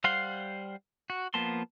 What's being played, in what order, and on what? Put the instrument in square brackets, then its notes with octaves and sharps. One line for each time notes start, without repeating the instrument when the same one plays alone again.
[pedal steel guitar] G3 C5 F5 F#5 C6
F#4
F3 A#3 B3 A5 C6